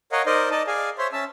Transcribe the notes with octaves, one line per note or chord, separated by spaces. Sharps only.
A#4 C#5 D#5 F5 F#5
D#4 A#4 C5 D5 D#5
D#4 D5 D#5 A5
G#4 D5 F5 G#5
C5 C#5 E5 C6
C#4 E5 A5 E6